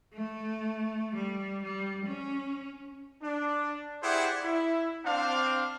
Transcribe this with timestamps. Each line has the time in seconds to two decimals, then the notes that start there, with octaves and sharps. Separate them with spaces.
0.14 A3
1.15 G3
1.63 G3
2.06 C#4
3.23 D4
4.03 E4 G4 G#4 C5 D5 F#5
4.44 E4
5.06 C4 D4 F5